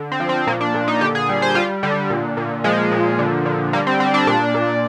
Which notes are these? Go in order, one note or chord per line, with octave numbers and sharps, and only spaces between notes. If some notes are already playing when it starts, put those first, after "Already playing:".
Already playing: D3
C4
F3
C4
A#2 A#3
D4
A#2
D#4
D3 G4
G#4
G3
C5
G3 F4
D3 G3
A#2
A#2
F3 G#3
A#2
D3
D3
G3 A#3
C4
G3 C4
D4
A#2 D4
A#2